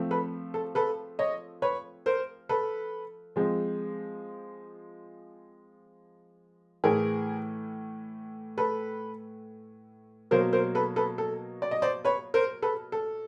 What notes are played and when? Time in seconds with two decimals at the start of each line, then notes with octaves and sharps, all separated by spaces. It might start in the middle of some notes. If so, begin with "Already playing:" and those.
Already playing: F3 A3 C4
0.11 A4 B4
0.54 A4
0.75 A4 B4
1.19 C#5 D#5
1.62 B4 C#5
2.06 A#4 C5
2.49 A4 B4
3.36 F3 G#3 C4
6.84 A2 E3 A3 G#4 A#4
8.58 A4 B4
10.31 B2 F#3 A#3 A#4 C5
10.53 A#4 C5
10.75 A4 B4
10.96 A4 B4
11.18 A4
11.62 D5
11.71 D#5
11.82 C5 D5
12.05 B4 C#5
12.34 A#4 C5
12.62 A4 B4
12.92 A4